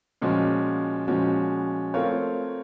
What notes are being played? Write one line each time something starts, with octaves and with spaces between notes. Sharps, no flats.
A#2 F3 G#3 C#4 F#4
A#2 F3 G#3 C#4 F#4
A3 C4 F4 A#4 C#5